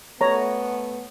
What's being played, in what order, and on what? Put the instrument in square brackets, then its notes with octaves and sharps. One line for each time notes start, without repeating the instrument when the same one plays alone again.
[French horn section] A3 B3 [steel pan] C#5 A#5